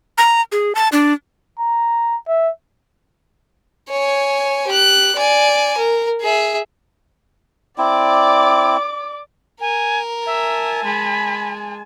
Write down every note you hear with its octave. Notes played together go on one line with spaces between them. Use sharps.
A#5
G#4
A5
D4
A#5
E5
C#5 G#5
G4 F#6
D5 G#5
A#4
G#4 E5
C4 E4 D5 D6
A#4 G#5
E5 G#5 A5
G#3 B5